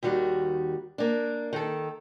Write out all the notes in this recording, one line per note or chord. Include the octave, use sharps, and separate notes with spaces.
D#2 D#3 G3 F#4
A#3 D4
D#3 A4